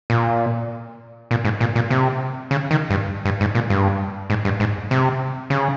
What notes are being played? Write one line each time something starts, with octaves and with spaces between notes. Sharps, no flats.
A#2
A#2
G#2
A#2
A#2
C3
C#3
D#3
G2
G2
G#2
A#2
G2
G#2
G2
G#2
C3
C#3